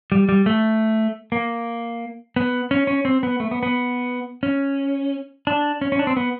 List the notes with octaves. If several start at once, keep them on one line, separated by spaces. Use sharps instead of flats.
G3
G3
A3
A#3
B3
C#4
C#4
C4
B3
A3
B3
B3
C#4
D4
C#4
C#4
D4
C4
B3